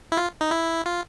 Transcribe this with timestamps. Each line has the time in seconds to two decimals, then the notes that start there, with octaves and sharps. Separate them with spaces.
0.12 E4
0.17 F4
0.41 D#4
0.51 E4
0.86 F4